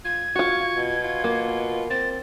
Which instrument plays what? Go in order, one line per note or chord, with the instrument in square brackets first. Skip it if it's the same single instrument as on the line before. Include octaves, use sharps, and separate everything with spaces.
[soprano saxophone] F4 [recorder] G#6
[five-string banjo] F4 F#4 [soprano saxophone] C#6
[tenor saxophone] B2
[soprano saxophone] F4
[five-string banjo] A#3
[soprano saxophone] C4 [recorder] A6